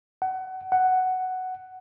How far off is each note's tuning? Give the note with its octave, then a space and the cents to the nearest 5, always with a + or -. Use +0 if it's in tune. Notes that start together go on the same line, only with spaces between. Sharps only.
F#5 +25
F#5 +5